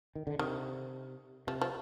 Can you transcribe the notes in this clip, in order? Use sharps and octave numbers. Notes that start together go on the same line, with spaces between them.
D#3
D3
C3 D#3
C3 F3
F3